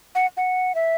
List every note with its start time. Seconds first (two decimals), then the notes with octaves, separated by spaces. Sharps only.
0.15 F#5
0.37 F#5
0.75 E5